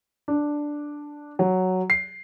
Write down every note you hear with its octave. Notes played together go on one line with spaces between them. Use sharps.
D4
F#3
C7